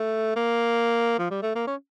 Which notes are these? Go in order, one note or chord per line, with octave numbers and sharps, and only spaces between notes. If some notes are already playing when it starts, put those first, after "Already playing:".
Already playing: A3
A#3
F3
G3
A3
A#3
C#4